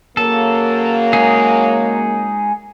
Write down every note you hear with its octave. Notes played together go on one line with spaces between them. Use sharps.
C#3 F#3 A#3 A4
G#3 D#4 G#4